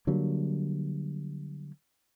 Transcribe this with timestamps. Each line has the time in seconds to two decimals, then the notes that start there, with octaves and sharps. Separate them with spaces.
0.07 D3 F#3 G3 A#3